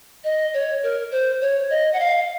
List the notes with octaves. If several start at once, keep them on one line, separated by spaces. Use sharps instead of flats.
D#5
C#5
A#4
C5
C#5
D#5
F#5
F5